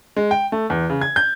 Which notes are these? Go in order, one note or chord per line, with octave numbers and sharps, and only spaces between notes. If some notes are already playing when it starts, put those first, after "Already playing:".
G#3
G5
A3
E2
C#3
G#6
G6